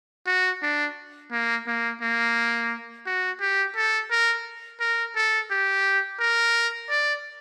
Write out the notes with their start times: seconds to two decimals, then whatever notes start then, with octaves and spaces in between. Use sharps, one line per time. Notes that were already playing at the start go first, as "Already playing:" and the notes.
0.27 F#4
0.62 D4
1.32 A#3
1.67 A#3
2.01 A#3
3.06 F#4
3.41 G4
3.76 A4
4.11 A#4
4.80 A#4
5.16 A4
5.51 G4
6.20 A#4
6.90 D5